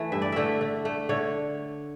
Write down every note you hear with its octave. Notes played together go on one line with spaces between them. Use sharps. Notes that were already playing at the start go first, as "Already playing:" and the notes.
Already playing: E3 A3
G2 E5
D5
D3 A3 E5
D3
A3
D3 C#5